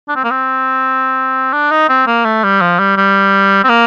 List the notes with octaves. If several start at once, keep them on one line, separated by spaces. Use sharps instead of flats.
D4
C4
A#3
C4
D4
D#4
C4
A#3
A3
G3
F3
G3
G3
C4
A#3